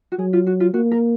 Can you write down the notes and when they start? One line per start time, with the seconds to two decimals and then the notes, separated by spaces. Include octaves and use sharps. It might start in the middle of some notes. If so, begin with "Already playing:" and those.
0.12 F#4
0.19 F#3 G#4
0.33 F4
0.47 F#4
0.60 F4
0.74 A#3 F#4
0.91 A#4